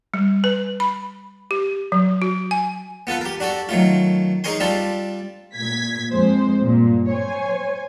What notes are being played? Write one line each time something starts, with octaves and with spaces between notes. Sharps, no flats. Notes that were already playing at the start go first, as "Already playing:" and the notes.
G3
B4
B5
G4
F#3
F#4
G#5
B3 F4 A4 B4
G4 A#4
D4 F#4 G4 A4
D#3 F#3 A3 F4
D#4 G#4 A#4 C#5 G#5 C6
G3 C4 D4 F4 G4 A4
A#2 G#6 B6
F2 G#3 C5
G2 A#2
C5 C#5 G#5